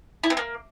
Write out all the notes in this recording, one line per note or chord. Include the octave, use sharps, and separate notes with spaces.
E4
C4
A#3